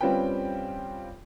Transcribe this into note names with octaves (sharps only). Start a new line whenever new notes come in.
G3 C4 C#4 F4 B4 G5